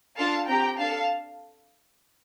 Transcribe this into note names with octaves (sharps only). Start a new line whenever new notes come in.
D4 F4 A4 F5 A5
C4 G4 G5 A#5
D4 A4 F5 A5